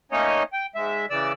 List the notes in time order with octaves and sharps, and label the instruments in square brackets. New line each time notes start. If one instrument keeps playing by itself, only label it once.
[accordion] A3 A#3 C#4 D#4 C#5 D#5
G5
G#2 G#3 E5
C#3 E3 D5 E6